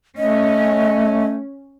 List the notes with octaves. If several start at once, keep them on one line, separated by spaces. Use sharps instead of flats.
A3 C#4 D#5